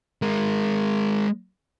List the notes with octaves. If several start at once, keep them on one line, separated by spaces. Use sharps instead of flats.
G#3 A#4